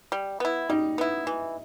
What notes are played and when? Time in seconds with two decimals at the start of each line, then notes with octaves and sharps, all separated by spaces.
0.12 G3
0.40 B3 E4
0.69 G3 D#4
0.98 B3 E4
1.27 E3